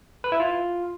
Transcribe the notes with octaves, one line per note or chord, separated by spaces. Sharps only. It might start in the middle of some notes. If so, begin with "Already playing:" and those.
B4
E4
F4